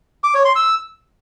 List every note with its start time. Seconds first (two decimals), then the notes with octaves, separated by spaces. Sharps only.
0.24 D6
0.34 C#5
0.45 C6
0.56 E6